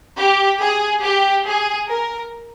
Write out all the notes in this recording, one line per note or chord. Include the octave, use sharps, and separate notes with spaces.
G4
G#4
G4
G#4
A#4